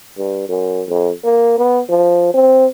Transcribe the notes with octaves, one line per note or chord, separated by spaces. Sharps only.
G2
F#2
F2
A#3
B3
F3
C4